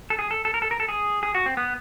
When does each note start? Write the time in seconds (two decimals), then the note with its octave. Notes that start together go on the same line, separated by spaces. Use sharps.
0.10 A4
0.19 G#4
0.31 A4
0.45 A4
0.54 A#4
0.62 A4
0.71 A#4
0.80 A4
0.89 G#4
1.23 G#4
1.35 F#4
1.46 C4
1.57 B3